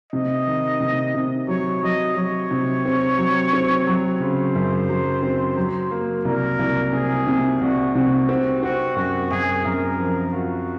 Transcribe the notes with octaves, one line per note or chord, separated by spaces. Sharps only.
C3 D#5
D#3
C3
C3
F#3 C#5
F#3 D#5
F#3 C#5
C3
C4
F#3
C4
F#3
C#3 C5
F#2
F#3
C4
F#3
A#3
C2 A#4
C2
C3 G#4
C3
C2 F#4
C3 F#4
C4 F#4
C4 F#4
F#2 F#4
F#2 G#4
F#2 A#4
F3
F4 F#4